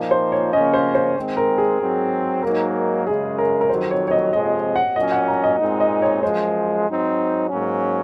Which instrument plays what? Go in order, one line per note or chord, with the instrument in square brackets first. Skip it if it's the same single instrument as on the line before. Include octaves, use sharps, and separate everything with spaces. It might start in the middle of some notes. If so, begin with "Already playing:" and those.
Already playing: [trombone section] A#2 F3 A#3 D#4
[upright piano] C5
C#5
[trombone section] C#3 F3 A#3 C#4 [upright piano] D#5
[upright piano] C5
C5
[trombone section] D#3 G#3 C4
[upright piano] A#4
G#4
[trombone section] G#2 F#3 C4
[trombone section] G#2 F#3 A#3 D#4 [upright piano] A#4
[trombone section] F#2 C#3 G#3 [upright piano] G#4
[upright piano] A#4
A#4
[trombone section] F2 D#3 F#3 [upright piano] C5
[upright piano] C#5
C#5
D#5
[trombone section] F2 C3 F3 G#3 [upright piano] D#5
[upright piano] F#5
[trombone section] A#2 F#3 C#4 [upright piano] D#5
[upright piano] F#5
A#5
D#5
[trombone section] A#2 G#3 C4 D#4
[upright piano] D#5
C#5
[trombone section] F#2 F3 G#3 [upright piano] C5
[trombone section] G#2 F#3 C4 D#4
G#2 F#3 A#3 C#4